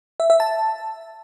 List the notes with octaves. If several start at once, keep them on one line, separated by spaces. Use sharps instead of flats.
E5
E5
A5